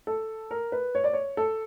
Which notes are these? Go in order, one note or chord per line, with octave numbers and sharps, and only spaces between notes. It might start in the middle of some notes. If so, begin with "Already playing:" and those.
A4
A#4
B4
C#5
D5
C#5
A4